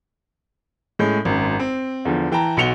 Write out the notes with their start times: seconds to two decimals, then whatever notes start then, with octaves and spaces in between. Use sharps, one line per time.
0.99 A2 G#3 C#4 G6
1.25 G#1 F#2
1.59 C4
2.05 E2 D3 F3
2.32 E3 G5 A5 A#5
2.57 B1 F#4 C#7 F7 G7